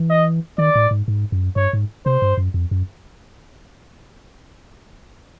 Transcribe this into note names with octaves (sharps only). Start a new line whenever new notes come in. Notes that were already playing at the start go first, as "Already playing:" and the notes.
Already playing: E3
D#5
D#3 D5
A2
G#2
G#2
F#2
G2 C#5
G#2
C3 C5
G2
F#2
F2
F#2